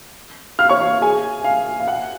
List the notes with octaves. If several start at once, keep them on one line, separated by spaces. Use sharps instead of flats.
F5 F6
C#5 C#6
F5
G#4 G#5
F5
F5
F#5